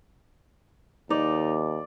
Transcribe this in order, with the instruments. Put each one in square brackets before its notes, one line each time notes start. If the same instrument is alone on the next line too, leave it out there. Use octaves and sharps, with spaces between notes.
[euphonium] D#2 [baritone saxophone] D#4 [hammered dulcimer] D5